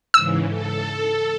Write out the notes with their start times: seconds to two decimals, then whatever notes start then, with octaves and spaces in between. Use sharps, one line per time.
0.14 G#2 C#3 E3 E6
0.48 A4